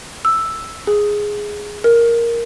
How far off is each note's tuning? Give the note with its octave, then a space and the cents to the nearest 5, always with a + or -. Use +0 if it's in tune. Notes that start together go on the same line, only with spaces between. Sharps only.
E6 +0
G#4 -5
A#4 +0